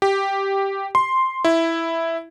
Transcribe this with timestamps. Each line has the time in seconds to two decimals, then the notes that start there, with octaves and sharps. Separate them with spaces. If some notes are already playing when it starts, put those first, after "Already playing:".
0.02 G4
0.95 C6
1.45 E4